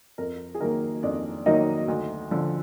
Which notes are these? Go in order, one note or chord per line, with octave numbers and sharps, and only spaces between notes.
F2 A#4
G#4
D#3 F#3 A#3 A#4
F2 D4 D5
D#3 F#3 A#3 D#4 D#5
D2
D3 F3